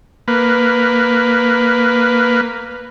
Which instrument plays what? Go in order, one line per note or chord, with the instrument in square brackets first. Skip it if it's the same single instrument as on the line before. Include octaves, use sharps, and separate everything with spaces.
[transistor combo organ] A#3 B4